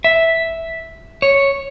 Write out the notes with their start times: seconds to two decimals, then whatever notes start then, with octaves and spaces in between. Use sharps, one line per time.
0.04 E5
1.22 C#5